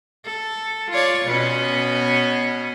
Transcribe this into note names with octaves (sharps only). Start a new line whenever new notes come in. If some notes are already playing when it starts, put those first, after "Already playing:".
A4
F4 C#5 D5
B2 B3 C#4